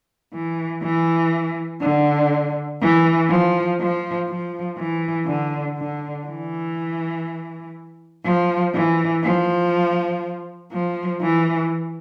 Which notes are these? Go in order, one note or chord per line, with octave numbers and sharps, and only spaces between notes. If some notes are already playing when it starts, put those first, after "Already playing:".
E3
E3
D3
E3
F3
F3
F3
E3
D3
D3
E3
F3
E3
F3
F3
E3